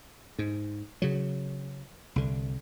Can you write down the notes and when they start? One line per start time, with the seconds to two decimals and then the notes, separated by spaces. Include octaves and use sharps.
0.39 G#2
1.02 C#3 F#3
2.16 C2 D3